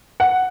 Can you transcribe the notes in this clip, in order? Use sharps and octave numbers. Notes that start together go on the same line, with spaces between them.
F#5